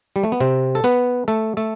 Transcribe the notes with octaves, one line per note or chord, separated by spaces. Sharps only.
G3
A3
B3
C3 C4
A4
B3 B4
A3 A4
A3 A4